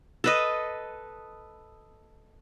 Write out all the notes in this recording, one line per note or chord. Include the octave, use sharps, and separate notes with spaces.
A4 B4 D#5